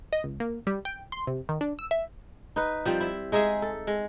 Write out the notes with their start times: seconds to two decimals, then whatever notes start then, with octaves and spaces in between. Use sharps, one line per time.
0.13 D#5
0.24 C#2
0.40 A#3
0.67 G3
0.85 G5
1.12 C6
1.27 C3
1.49 D#3
1.61 D4
1.79 E6
1.91 E5
2.56 D#4 B4
2.86 F3 G3 C4
3.00 E4 E5
3.32 G#3 D#4 G#4 E5
3.62 A4
3.87 G#3